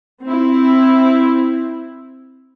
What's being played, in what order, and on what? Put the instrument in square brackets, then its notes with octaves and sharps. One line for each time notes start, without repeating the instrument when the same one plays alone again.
[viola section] C4 E4